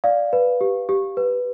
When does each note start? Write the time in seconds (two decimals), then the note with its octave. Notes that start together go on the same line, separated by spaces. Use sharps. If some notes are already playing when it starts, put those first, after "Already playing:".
0.04 D5 F5
0.33 B4
0.61 G4
0.89 G4
1.17 B4